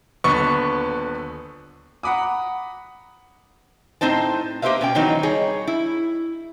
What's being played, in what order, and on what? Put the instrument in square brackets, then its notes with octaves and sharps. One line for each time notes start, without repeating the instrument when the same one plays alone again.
[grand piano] D#1 D3 B3 [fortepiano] C#6
[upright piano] F#5 A#5 B5 D6 D#6
[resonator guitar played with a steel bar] A2 C4 D#4 C5 A5
A#3 G4 B4 C5 E5 F5
B2 C#4 G5
D#3 E3 F#3 B3 C4 D#4
G3 D#4 G#4 C#5
E4